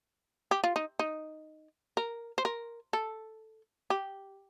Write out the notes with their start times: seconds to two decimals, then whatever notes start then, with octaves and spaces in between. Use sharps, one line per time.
0.51 G4
0.64 F4
0.76 D#4
0.99 D#4
1.97 A#4
2.38 C5
2.45 A#4
2.93 A4
3.90 G4